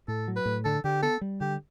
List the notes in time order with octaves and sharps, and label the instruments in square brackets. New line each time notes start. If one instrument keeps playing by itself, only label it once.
[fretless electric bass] A2 [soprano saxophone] A4
[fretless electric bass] F#3
[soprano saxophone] B4
[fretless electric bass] A2
[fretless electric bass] D3 [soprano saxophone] A4
[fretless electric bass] D3 [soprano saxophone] G4
[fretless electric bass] B3 [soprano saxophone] A4
[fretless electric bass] G3
[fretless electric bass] D3 [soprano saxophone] G4